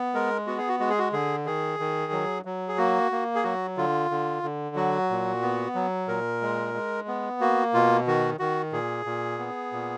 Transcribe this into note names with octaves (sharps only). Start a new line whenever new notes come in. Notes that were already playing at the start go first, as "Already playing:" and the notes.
Already playing: B3
G#3 A#4
B3 F#4
G#4
F#4
G#3 F#4
G#4
F#4
D3 G#4
D#3 G#4
D#3
F#3
F#3
G#4
A#3 F#4
A#3
G#4
F#3 F#4
D3 F4
D3
D3
F#3 F#4
A#2
B3
F#3
A#2 A#4
G#3
G#3
B3
A#3 F#4
B2 F4
D#3 F#4
D#3 F#4
A#2 G#4
A#2
B3
A#2